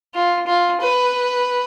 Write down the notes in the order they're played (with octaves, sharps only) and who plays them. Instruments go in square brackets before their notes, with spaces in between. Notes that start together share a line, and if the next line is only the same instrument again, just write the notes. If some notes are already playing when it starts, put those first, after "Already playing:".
[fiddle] F4
F4
B4